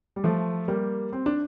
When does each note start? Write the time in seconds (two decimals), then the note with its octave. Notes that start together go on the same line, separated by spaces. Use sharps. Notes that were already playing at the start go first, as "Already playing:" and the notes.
0.16 G3
0.24 F3 A3
0.68 G3 A#3
1.13 C4
1.26 D4